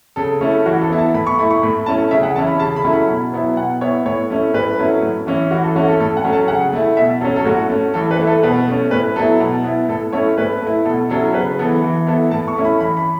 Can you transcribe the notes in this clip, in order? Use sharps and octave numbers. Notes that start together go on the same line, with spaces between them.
C#3 A4
A3 C#4 E4
E3 F#4
A4
B3 E4
A5
A2 B5
C#6
A3 E4 B5
C#6
A2 B5
A3 C#4 E4 A5
C#3 E5
F#5
E3 C#4 E4 A5
B5
C#3 A5
B5
F#3 A3 C#4 E4
B5
B2
F#3 B3 E4
B2 F#5
B3 E4 C#5
A2 C#5
A3 C#4 E4
A2 B4
F#3 A3 C#4 E4
A2
E3 C#4 E4
E3 F#4
A4
A3 C#4 E4 F#4
A4
A2 A4
F#5
F#3 A3 C#4
A5
C#3 F#5
A3 E4
B2 E5
F#3 C#4 A4
A4
A2 F#4
A3 C#4
E3 A4
B4
A3 E4
A4
B2 B4
A3 C#4
A2 B4
F#3 B3 E4 A4
B2
B3 E4
A2 A4
A3 C#4 E4 C#5
A2 B4
A3 E4
B2 A4
F#3 C#4 E4 A4
C#3 B4
E3 B3 A4
E3
B3 E4 A4
A2 A5
C#6
A3 C#4 E4
B5
E3 B5
B5